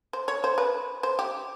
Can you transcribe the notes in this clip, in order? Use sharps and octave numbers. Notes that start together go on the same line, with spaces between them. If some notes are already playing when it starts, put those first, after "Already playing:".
C5
C#5
C5
B4
C5
G4